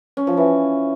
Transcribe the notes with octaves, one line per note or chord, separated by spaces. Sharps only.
C#4
F3
E3